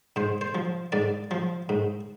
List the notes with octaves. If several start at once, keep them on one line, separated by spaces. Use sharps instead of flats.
G#2 C5
C5
F3
G#2 D5
F3
G#2